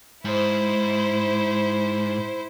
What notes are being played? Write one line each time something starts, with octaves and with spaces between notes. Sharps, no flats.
G#2 E4 C5